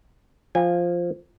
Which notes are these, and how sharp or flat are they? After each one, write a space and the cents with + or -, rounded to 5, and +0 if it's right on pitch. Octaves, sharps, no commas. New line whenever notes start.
F3 +0 G#5 -25